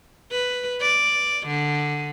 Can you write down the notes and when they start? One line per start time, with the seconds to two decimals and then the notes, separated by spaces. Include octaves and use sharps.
0.32 B4
0.81 D5
1.47 D3